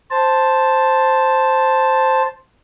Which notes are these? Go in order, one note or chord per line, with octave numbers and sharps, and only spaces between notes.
C5 A5